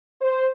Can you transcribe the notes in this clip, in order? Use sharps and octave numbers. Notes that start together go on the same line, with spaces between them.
C5